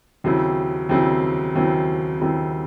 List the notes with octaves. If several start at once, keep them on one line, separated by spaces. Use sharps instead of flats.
D#2 C#3 F#3 C4 E4
D#2 C#3 F#3 C4 E4
D#2 C#3 F#3 C4 E4
D#2 C#3 F#3 C4 E4